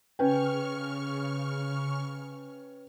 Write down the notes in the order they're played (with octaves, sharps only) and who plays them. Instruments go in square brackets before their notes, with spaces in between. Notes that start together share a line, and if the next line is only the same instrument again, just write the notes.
[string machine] C#3 C#6 F6 [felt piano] C#4 B4 G5